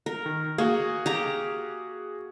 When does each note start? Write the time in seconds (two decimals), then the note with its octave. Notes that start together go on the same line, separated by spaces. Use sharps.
0.06 A#4
0.26 D#3
0.58 A#3 F#4 G#4
1.06 G4 A#5